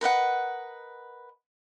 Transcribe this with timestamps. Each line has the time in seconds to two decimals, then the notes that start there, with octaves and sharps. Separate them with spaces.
0.01 A#4 B4 D#5 F#5